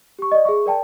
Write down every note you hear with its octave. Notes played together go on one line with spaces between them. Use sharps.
G4 C#6
D5 D#5
G#4 E5 C#6
A#4 D5 G5 A5